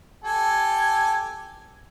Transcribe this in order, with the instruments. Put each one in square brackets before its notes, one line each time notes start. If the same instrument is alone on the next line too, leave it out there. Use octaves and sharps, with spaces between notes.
[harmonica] G4 A4 G#5